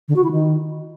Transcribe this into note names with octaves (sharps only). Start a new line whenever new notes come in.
D3
F#4
E4
D#3